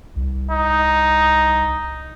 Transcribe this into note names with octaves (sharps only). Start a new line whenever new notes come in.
C2
D#4